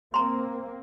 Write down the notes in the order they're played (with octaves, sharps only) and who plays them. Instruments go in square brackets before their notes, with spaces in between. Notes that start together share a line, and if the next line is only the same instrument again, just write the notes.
[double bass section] A#3 C4 [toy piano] A#5 C6